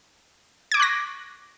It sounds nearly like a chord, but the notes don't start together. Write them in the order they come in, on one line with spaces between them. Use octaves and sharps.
G#6 D6 C#6 F#6 A#6